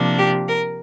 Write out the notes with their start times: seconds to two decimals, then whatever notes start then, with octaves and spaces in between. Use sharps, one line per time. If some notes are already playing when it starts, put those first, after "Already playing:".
Already playing: C3 F3 A#3 D4
0.18 G4
0.47 A#4